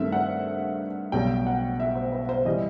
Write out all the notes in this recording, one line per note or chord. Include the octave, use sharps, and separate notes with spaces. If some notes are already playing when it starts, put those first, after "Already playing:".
Already playing: G2 D#3 A3 C4 E5
F#5
B1 B2 G3 B3 G5
F#5
E5
C5
B4
C5
E3 G3 D#5